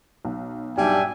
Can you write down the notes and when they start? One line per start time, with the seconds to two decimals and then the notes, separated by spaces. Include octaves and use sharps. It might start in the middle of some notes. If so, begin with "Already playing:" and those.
0.25 B1
0.78 B1 G#2 B2 G3 D4 E5 G5 G#5